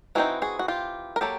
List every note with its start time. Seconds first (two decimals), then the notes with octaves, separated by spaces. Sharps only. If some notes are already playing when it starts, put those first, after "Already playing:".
0.15 E3 G#3 C4 D#4 E4 F#4
0.42 F#4 G#4
0.59 F#4
0.68 F4 G4
1.16 A#4
1.21 F#3 A#3 G4 A4